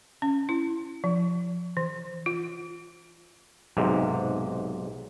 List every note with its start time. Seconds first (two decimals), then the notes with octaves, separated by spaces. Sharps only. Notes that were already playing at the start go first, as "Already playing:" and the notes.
0.22 C#4
0.49 E4
1.04 F3
1.77 E3
2.26 F4
3.77 B1 G#2 C3